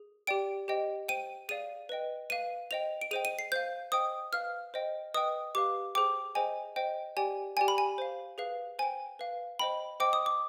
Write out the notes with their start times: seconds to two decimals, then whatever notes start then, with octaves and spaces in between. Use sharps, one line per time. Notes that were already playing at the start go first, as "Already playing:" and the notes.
Already playing: G#4
0.27 G4 D5 G5 D7
0.68 G4 C5 D#5 G5
1.09 C5 G5 D#7
1.49 G#4 D5 F5 D#7
1.89 B4 D#5 G5
2.30 B4 F5 D#7
2.71 C5 D#5 G5 F7
3.01 D7
3.11 G#4 C5 D#5 G5 D#7
3.25 D#7
3.39 C7
3.52 C5 F5 G6
3.92 C5 D#5 G5 D#6
4.32 B4 F5 F6
4.74 C5 D#5 G5
5.14 B4 D#5 G5 D#6
5.55 G4 B4 F5 D6
5.95 G#4 C5 G5 D6
6.35 G#4 C5 D#5 G5 G#5
6.76 C5 D#5 G5
7.17 G4 D5 G5 G#5
7.57 G4 D5 G5 G#5
7.68 B5
7.78 G#5
7.98 C5 F5
8.38 G#4 B4 F5
8.79 C5 G5 G#5
9.19 B4 F5
9.59 C5 D#5 G5 B5
10.00 C5 D#5 G5 D6
10.13 D#6
10.26 D6